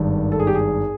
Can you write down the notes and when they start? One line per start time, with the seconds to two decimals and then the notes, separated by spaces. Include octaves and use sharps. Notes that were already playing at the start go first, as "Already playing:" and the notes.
Already playing: G#1 G2 D#3
0.32 A4
0.39 G#4
0.47 G4
0.55 G#4